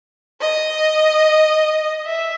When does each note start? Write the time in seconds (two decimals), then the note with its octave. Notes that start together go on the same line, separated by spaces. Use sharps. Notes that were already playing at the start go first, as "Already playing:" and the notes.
0.41 D#5
2.06 E5